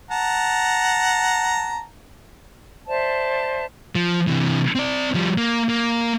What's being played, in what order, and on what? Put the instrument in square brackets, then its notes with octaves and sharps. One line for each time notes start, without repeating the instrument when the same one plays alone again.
[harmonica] F#5 A5 A#5
[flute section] C5 D5 E5 A5
[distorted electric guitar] F3
C3 E3
C4 D5
F3 G3
A#3
A#3